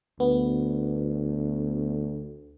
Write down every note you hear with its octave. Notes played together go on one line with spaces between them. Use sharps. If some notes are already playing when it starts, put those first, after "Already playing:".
D2 B3